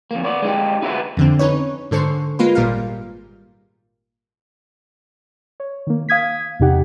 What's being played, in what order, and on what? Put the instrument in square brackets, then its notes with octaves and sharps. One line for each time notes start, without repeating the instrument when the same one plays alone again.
[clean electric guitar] F2 A#3
B3 C#5 D5
G#3 D#4 G4
D#4 E4 F#4 B4 E5
[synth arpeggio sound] F2 D3 C4
C#4 D#4 B4 C#5
G#2 D3 A4 C5 C#6 C7
G#3 A#3 F4 B4
G#1 A#2 G3 A#4 F5
[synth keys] C#5
D#3 A#3
F5 D#6 G#6 B6
E2 C3 D#4 G4 F#5